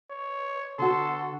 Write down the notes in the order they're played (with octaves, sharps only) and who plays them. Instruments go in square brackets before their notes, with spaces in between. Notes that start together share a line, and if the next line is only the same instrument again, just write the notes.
[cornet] C#5
[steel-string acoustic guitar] D3 F#4 [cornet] A4 [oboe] C6